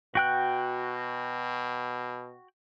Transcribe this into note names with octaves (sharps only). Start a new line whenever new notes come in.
B2 F#4 G5 F#6